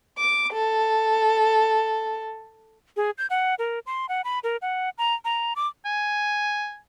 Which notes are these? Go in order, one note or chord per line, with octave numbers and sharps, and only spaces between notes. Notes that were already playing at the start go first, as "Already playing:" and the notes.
D6
A4
G#4
G6
F#5
A#4
C6
F#5
B5
A#4
F#5
A#5
A#5
D6
G#5